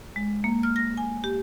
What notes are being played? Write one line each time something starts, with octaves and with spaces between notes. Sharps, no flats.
G#3
A#3
F6
A#6
G#5
G4